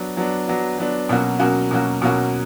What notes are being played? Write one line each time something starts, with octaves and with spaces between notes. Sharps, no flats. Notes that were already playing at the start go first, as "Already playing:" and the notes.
Already playing: F#3 B3 D4
F#3 B3 D4
F#3 B3 D4
F#3 B3 D4
B2 F#3 A#3 C#4 F#4
B2 F#3 A#3 C#4 F#4
B2 F#3 A#3 C#4 F#4
B2 F#3 A#3 C#4 F#4